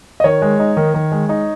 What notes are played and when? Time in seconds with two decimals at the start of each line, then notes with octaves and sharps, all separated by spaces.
0.20 D#5
0.24 D#3 C#5
0.42 G#3
0.59 D#4
0.77 D#3
0.94 D#3
1.12 G#3
1.29 D#4